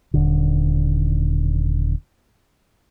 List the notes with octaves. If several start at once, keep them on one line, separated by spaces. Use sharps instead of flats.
D#1 D3